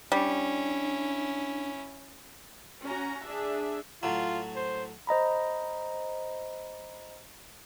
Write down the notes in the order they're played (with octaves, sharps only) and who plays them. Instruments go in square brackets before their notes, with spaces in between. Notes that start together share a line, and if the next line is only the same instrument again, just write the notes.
[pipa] G3 [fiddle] C#4 E4 [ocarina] D4
[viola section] C#4 F#4 A#5
D4 G#4 E5
[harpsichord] A2 F#3 [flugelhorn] F4
[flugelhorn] C5
[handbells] C5 D#5 A#5 B5